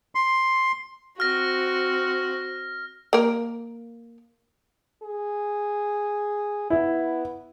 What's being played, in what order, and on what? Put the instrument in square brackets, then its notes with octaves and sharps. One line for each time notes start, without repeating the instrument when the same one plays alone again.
[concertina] C6
[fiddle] C4 F#4 [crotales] F6 A#6
[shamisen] A#3 A#4
[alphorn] G#4
[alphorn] B3 [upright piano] E4